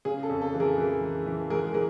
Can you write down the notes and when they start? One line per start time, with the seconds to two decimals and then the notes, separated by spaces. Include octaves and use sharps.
0.05 C#3 G#4
0.23 A4
0.29 F2
0.42 A4
0.54 E3
0.60 G#4 A#4
0.78 E3
1.02 G#3
1.26 E3
1.50 G#2 G#4 A#4
1.74 E3 G#4 A#4